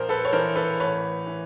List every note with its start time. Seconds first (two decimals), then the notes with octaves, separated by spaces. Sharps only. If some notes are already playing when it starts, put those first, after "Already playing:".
Already playing: A#1 A#4 C5
0.09 A4 B4
0.25 C#5
0.32 E3 A#4 C5
0.56 A4 B4
0.80 A1 B4 C#5
1.27 E3